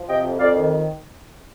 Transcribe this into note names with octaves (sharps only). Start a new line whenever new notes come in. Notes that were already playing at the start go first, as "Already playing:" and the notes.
Already playing: F3
C3 D#5 G5
F2
F2 D5 F5
D#3